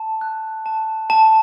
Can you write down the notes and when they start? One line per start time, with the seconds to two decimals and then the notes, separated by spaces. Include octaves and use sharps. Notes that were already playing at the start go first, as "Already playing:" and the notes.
Already playing: A5
0.21 F#6
0.66 A5
1.10 A5